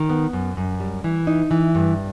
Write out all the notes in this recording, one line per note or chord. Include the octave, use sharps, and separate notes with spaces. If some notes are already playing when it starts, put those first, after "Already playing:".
Already playing: D#3
B3
F#2
F#2
G3
E3
D#4
E3
G2